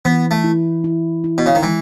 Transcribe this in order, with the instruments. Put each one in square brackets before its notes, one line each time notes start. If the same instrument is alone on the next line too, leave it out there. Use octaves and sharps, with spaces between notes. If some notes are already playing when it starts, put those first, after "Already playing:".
[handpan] E3 [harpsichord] B3
[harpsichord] A3
[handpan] E4
E4
E4
[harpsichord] B2
C#3
D#3
[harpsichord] E3 [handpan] G#3